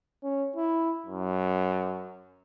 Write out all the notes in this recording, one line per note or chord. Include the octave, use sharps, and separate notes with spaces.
C#4
E4
F#2